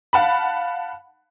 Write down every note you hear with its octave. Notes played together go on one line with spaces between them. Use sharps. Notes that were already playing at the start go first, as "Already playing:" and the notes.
F5 F#5 A5 B5